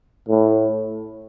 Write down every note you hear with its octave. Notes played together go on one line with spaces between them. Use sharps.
A2